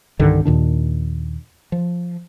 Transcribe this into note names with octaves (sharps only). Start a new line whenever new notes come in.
C2 G2 D3 D#3
D#2 A#2 D#3 D4
F3